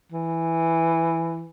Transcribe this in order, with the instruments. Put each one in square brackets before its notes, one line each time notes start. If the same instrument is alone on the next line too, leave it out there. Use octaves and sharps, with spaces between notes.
[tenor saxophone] E3